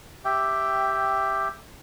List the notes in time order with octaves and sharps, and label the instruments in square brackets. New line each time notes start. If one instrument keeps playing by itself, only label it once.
[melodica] G4 E5 G5